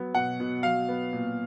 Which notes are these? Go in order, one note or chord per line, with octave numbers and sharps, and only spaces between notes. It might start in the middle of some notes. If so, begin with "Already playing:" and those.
Already playing: F#3 B3
B2 F#5
B2
F#3 F5
B3
A#2